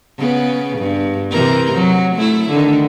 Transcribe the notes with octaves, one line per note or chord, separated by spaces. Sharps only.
C#3 B3
G2
C3 E3 A#4
F#3
A3 E4
D3 D#3